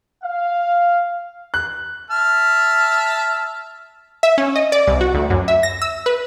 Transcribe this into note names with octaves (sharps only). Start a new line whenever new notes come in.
F5
F#6
E5 A5 F6
E5
C#4
D#5
D5
C2
F#4
D2
F#2
E5
A#6
E6
B4